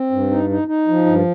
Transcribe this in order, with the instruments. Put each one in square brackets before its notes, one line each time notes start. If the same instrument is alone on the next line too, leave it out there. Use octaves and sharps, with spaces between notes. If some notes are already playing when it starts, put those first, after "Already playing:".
Already playing: [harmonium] C4
G2
D#4
D#4
D#4
F3
G2